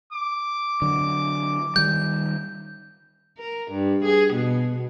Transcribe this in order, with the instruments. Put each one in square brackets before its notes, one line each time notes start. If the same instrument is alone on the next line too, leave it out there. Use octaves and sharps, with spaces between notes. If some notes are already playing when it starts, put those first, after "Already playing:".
[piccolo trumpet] D6
[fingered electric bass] D3 F#3
[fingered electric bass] D#3 G3 [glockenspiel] G6
[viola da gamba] A#4
G2
G#4
B2